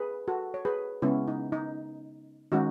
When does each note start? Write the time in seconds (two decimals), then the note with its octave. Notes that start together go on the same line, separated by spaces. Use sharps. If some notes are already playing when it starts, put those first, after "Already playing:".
Already playing: G#4 B4
0.28 F#4 A4
0.54 C#5
0.65 G#4 B4
1.02 C#3 G#3 B3 C#4 E4
1.28 D#4
1.52 D#4
2.52 D#3 G#3 C#4 D#4 F#4